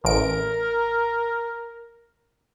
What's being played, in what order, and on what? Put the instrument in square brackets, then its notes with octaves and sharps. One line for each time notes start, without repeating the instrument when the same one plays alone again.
[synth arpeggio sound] A1 D7 [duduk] A#4